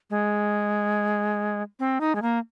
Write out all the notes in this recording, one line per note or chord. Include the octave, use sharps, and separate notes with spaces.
G#3
C4
D#4
G#3
A#3